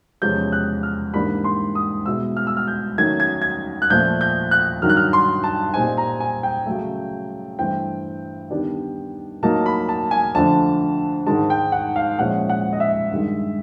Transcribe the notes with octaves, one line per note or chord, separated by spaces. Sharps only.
E2 C3 F3 G#3 C#4 G6
F#6
F6
G#2 E3 G3 A#3 D4 B5
C6
D#6
B2 G#3 B3 E4 E6
F6
E6
F6
G6
D#3 F#3 A3 C#4 G#6
G#6
G#6
F#6
A#2 F3 A3 G6
G6
F#6
G2 D#3 F#3 F6
F#6
F6
C6
A5
A#2 G3 C4 D#4 G#5
A#5
G#5
G5
C#3 F#3 A3
G2 E3 A3 C4 E4 G5
D#3 G3 B3 D4
A2 F#3 A#3 D#4 A5
B5
A5
G#5
F2 D3 F3 A3 D4 A5
G#2 D#3 G#3 A5
G5
F#5
F5
A#2 F3 G#3 C#4 E4 F#5
F#5
D#5
E5
G2 D#3 G#3